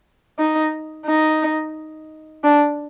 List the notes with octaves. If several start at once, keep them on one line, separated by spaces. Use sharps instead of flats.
D#4
D#4
D4